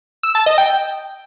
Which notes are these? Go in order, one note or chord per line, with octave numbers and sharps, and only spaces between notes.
E6
A5
D#5
G5